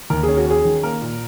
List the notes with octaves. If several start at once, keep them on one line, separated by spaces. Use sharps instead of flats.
D#2 A#4
G#4
C#4
F#4
C#4 G#4
D#3
A#3 A#4
A#2